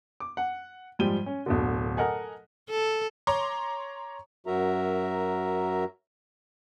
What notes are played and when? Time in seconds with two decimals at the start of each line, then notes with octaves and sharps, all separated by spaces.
0.20 D6
0.37 F#5
0.99 G#2 F3 G3 G5 D#7 G7
1.26 C#4
1.46 D1 B2 D3
1.97 A4 A#4 D#5 F#5 G#5
2.69 A4
3.27 C#5 A#5 C6 D6
4.46 F#2 F#3 F#4 A#4 E5 A#5